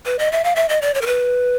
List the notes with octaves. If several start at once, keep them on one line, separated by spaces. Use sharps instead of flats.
B4
D#5
E5
F5
E5
D#5
D5
C#5
A#4
B4